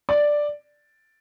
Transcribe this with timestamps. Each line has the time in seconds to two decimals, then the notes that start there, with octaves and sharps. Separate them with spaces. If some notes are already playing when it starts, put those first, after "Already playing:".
0.09 D5